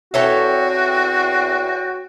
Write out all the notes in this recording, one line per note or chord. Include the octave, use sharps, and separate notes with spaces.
E2 C4 F#4 A4 C#5 E5 G5